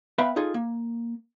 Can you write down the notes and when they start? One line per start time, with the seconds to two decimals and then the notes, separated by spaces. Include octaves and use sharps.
0.18 B3 B4 E5 F5 G5 B5
0.36 D#4 F4 G#4 A4
0.54 A#3